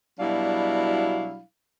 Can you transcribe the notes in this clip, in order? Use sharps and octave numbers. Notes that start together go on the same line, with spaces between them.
B2 F#3 G3 D4 E4 F5